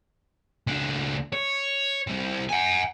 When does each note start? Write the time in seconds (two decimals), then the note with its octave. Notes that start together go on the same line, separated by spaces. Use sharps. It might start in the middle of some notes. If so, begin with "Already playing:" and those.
0.67 C#2 D4
1.33 C#5
2.07 C3 G3
2.49 F#5 G#5